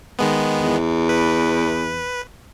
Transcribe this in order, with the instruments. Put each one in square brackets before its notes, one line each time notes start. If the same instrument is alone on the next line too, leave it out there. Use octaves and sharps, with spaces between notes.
[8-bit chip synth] D#3 G#3 B3
[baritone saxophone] E2
[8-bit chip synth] B4